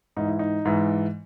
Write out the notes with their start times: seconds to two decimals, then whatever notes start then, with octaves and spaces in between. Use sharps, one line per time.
0.16 G#2 E3 D#4
0.27 E4
0.39 D#4
0.65 G#2 E3